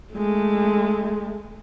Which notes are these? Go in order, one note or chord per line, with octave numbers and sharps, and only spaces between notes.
G#3 A3